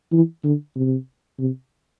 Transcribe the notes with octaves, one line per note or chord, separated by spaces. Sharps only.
E3
D3
C3
C3